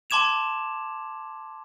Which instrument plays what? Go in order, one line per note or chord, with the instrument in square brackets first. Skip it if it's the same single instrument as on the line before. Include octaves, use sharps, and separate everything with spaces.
[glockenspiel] A5 C6 D6 G#6 E7 F7